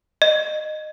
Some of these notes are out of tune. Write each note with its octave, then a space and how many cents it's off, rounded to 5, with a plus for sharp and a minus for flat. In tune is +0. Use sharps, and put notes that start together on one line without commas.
D#5 -15